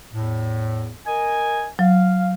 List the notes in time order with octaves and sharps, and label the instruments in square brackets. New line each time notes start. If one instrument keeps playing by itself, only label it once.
[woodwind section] E2 A2
A#4 D#5 G#5
[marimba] F#3 [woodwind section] F5